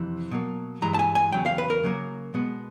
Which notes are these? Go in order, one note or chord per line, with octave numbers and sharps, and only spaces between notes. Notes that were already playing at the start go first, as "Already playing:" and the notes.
Already playing: F2 C3 E3
B2 F#3 A#3
G2 E3 G#3 A#5
A5
G#5
G#5
E2 C#3 F#3 G5
F5
B4
A#4
C#3 F#3 A#3
B2 G#3 B3